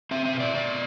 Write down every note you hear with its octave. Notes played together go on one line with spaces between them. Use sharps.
C4 E5
E5
B2
D5
B2 D5